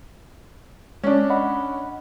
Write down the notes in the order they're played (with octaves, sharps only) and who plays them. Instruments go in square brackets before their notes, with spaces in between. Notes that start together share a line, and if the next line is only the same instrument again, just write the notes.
[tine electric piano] G#3 [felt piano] C#4 D4
[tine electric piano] D#5 F#5 B5